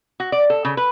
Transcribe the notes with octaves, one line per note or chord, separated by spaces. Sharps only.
F#4
D5
A4
C#3
B4